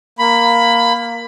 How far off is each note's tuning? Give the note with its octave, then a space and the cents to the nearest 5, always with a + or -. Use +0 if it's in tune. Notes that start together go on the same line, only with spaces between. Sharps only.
A#3 +5 B5 +15